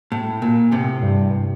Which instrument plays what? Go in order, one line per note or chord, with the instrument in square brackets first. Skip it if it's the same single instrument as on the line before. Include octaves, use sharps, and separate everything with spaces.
[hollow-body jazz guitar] A2
A#2
A2 C3
[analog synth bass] G2